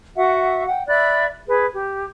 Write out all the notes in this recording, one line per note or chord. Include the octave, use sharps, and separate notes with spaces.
F#4 E5 F#5
F#5 G5
D5 E5 B5 F#6
G#4 B4
G4